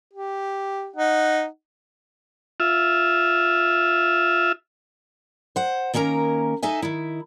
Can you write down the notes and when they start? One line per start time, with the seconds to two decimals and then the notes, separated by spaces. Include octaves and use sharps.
0.14 G4
0.96 D#4 F#5
2.60 F4 E5
5.56 C5 F#5
5.94 D#3 A#3 C#4 A#4 A#5
6.63 D#4 A4 E5 G#5
6.82 D#3 E4